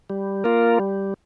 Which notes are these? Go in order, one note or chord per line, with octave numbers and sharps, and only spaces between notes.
G3
A#3 F4 A#4
G3